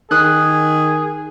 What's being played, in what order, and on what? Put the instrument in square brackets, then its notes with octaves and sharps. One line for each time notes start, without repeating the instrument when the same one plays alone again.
[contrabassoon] D#3 [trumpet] G#4 [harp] D#6 F#6